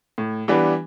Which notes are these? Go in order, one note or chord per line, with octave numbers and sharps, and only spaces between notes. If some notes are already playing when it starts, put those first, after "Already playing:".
A2
E3 G3 B3 D4